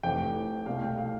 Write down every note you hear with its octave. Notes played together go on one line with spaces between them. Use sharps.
F1 F2 E3 A3 G5
C2 B2 A3 F5
G5
F5